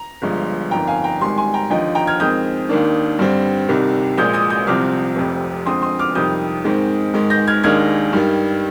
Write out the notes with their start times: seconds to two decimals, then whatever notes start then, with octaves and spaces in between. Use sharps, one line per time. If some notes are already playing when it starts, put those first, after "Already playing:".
Already playing: A#5
0.22 G1 G2 F3 G#3
0.71 G1 F2 D#3 G5 A#5
0.87 F5 G#5
1.04 G5 A#5
1.21 G#1 G#2 D#3 G3 G#5 C6
1.38 G#5 C6
1.54 G5 A#5
1.70 D#2 D3 F3 D#5 G5
1.95 G5 A#5
2.07 F6 G#6
2.20 F2 D#3 G#3 C4 D#6 G6
2.69 D#2 D#3 A#3 D4
3.19 G2 D3 G3 C4
3.68 C2 C3 D#3 G3
4.17 A#1 A#2 G#3 D#6 G6
4.33 D#6 G6
4.50 D#6 G6
4.67 C2 C3 F3 C4 D6 F6
5.16 F1 F2 C3
5.66 F2 D3 G#3 C4 C6 D#6
5.82 C6 D#6
5.99 D6 F6
6.15 F2 C3 D#3 G3 D#6 G6
6.64 G#2 D#3 G#3 C4
7.14 G#2 D#3 G#3
7.30 G6 A#6
7.47 F6 G#6
7.63 D#2 D#3 G#3 D4 F6 G#6
8.13 G2 D#3 G3